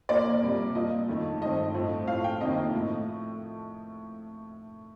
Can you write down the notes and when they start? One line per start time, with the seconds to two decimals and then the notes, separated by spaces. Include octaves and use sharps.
0.09 A#2 F3 A#3 D5
0.42 C3 G3 A#3
0.75 A#2 F3 A#3 D#5
1.08 F2 D#3 A3
1.41 G2 D#3 A3 C4 D#5
1.74 A2 F3 A3 C4
2.07 A2 A3 C4 F5
2.24 G5
2.41 F2 C3 D#3 A#3 D#5
2.74 A2 F3 A3